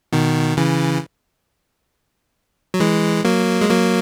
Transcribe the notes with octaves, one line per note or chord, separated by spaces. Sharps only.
B2 D#3
C#3 E3
F#3
E3 G#3
F#3 A#3
G#3
F#3 A#3